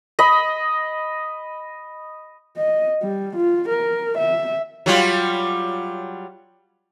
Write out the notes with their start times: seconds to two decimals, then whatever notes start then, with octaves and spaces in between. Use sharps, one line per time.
0.19 D#5 B5
2.57 D#5
3.03 G3
3.36 F4
3.68 A#4
4.18 E5
4.86 F#3 G3 F4